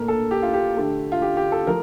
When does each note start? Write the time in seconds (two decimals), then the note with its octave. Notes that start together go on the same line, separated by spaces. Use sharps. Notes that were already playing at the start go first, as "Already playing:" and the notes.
Already playing: A#2 A3 A#4
0.08 A4
0.31 G4
0.42 F4
0.54 G4
0.77 D3 A3
1.12 F4
1.22 G4
1.37 G4
1.52 A4
1.67 F3 A3 A#4